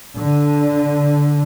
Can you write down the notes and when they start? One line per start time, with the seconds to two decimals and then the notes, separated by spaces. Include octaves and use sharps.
0.16 D3